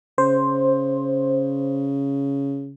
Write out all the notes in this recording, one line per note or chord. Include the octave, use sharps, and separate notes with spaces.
C#3 C5